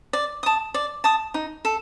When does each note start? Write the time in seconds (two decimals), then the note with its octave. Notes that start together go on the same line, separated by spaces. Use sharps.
0.13 D5
0.43 A5 D#6
0.74 D5
1.04 A5 D#6
1.34 D#4
1.65 A4